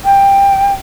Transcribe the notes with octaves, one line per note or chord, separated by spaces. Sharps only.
G5